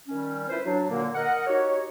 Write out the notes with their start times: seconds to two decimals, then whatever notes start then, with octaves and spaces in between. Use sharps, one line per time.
0.08 D#3 G3 C#4
0.49 E4 F4 B4 C5
0.66 F#3 D4
0.90 A#2 D3 A#3
1.15 A#4 D#5 F#5
1.47 D#4 F#4 G4 C#5